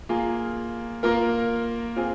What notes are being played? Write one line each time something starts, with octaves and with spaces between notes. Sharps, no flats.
A#3 F4 G#4
A#3 F4 A#4
C4 F4 G#4